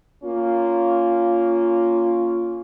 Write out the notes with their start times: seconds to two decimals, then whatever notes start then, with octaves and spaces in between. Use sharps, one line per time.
0.24 A#3 C#4 F4